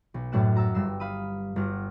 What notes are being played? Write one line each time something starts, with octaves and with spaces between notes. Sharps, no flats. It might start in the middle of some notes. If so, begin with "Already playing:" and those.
B1
F#2 A2 A3 D4 F#6 E7
F#4 A#5 E6 A6
G1 G2 G3 E6 C7
F5 B5 D#6
G1 F#4 F6